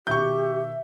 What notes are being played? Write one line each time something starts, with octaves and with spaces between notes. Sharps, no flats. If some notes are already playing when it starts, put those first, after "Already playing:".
B2 D#3 G4 E5 C#6 G6